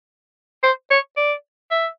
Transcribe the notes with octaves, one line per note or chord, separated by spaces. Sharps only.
C5
C#5
D5
E5